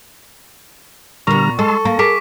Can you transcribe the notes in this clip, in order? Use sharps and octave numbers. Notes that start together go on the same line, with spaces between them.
A#2 D3 G3 B3 A#5 C#6 F6
G#3 A4 A5 C6 E6
A#3 A#5
G#4 A#4 D6 B6 D7